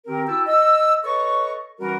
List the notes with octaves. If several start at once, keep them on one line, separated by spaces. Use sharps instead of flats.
D#3 C4 G4 A#4
E4 F#4 G5 A5 E6
D#5 E6
A4 B4 C#5 D#5 C#6
E3 G3 C#4 D#4 F#4 A#4